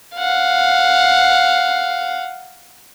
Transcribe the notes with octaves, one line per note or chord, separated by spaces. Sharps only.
F5 F#5